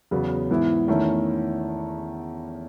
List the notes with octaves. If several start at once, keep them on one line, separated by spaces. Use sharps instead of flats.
E2 C#3 F#3 B3
G#2 E3 B3 E4
E2 D#3 A3 C#4 E4